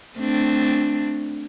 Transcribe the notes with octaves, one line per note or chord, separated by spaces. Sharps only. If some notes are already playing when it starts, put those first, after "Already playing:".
A3 C4 D4